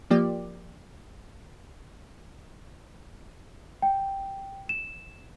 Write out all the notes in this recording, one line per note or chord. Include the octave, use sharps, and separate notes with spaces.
F3 A#3 G4 D5
G5
E7